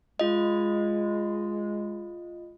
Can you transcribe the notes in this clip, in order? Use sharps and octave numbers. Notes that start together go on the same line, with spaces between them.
G#3 F4 D#5